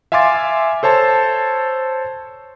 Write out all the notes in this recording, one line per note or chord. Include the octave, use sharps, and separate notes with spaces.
E5 F5 G#5 C6 D6 A6
A4 C5 C#5 A5